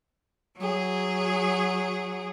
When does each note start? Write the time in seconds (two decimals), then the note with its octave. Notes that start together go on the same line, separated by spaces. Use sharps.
0.57 F#3 G#4